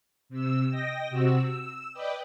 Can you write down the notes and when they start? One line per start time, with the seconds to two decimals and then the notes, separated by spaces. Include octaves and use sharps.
0.29 C3 E6
0.70 D#5 G5 A#6
1.10 C3 C4 F#4 E6
1.42 E6
1.93 B4 D5 D#5 G5